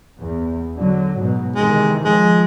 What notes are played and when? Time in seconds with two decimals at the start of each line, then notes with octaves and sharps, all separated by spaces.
0.19 E2
0.78 D3 F#3
1.19 G#2 B2 F#3
1.56 C3 D#3 E3 G#3
2.05 F3 G#3